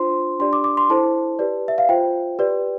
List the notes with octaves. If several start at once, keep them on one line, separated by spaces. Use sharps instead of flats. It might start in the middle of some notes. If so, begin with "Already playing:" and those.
Already playing: D4 F4 C5 C6
D4 G4 D5 C6
D6
D6
C6
E4 A4 C5 A5
G4 B4 D5
E5
F5
F4 C5 G5
G4 B4 D5